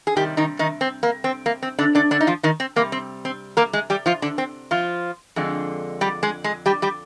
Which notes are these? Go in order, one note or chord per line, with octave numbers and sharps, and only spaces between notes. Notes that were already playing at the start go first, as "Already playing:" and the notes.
G#4
C3 D#3 G3 G4
D#3 D#4
D#3 D#4
C4
A#3
C4
A#3
C4
D3 D4
D3 D4
D3 D4
D#4
F3 F4
D#3 D#4
C4
C3 G3 A#3
C4
C4
A#3 A#4
G#3 G#4
G3 G4
F3 F4
D3 D4
C4
F3 F4
F2 D3 G#3
G3 G4
G#3 G#4
G#3 G#4
G3 G4
G3 G4